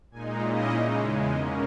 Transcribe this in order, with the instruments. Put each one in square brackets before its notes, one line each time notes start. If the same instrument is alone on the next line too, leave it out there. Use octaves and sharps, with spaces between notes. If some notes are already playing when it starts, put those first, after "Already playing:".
[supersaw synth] A#2 G#3 D#4 G#5
A#2 A#3 C#4 E4 D#5
C#3 G#3 D#4
E2 C#3 G#3 E5
B2 A#3 C#4 D#5